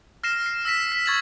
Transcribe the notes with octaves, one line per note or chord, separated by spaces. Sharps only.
F6 A#6 C7 E7
C7
E6 A#6 B6 E7
E7
B6
C#6 G#6 A6 E7 F#7